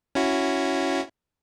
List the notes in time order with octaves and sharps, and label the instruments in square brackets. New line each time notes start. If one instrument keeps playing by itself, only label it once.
[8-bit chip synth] C#4 E4 F#4